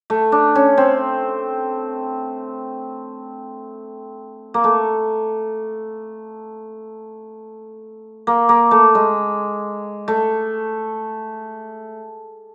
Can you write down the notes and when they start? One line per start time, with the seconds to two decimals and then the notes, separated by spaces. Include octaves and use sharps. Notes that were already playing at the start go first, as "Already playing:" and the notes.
0.10 A3
0.32 D4
0.56 C#4
0.78 C4
4.54 A#3
4.64 A3
8.27 A#3
8.49 A#3
8.71 A3
8.95 G#3
10.08 A3